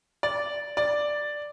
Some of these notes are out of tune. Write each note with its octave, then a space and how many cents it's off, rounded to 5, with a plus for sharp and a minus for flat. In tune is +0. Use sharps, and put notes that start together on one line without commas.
D5 -10
D5 +0